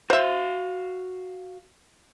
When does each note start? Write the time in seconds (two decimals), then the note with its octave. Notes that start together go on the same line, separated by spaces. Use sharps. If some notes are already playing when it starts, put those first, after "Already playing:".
0.10 F#4 C5 E5 F5